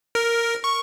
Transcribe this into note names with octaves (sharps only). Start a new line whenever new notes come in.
A#4
C#6